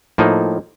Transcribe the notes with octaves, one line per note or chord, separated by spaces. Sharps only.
A2 F3 A#3 D#4